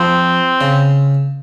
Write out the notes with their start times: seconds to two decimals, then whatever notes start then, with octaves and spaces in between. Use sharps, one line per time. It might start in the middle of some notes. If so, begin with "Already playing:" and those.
Already playing: F3 C4
0.61 C#3